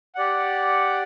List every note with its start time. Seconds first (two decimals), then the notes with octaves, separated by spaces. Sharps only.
0.15 G4 D5 F#5